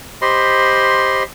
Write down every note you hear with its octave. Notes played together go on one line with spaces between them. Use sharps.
G4 C5 D#5 B5 C6